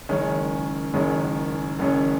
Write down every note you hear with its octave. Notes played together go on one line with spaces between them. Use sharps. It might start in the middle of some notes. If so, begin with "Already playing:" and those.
F#1 F#2 D#3 G#3 C#4
F#1 F#2 D#3 G#3 C#4
F#1 F#2 D#3 G#3 C#4